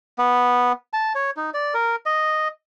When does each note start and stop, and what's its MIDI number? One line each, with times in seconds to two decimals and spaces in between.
0.18 0.72 59
0.93 1.13 81
1.15 1.31 73
1.37 1.50 63
1.54 1.74 74
1.74 1.96 70
2.06 2.48 75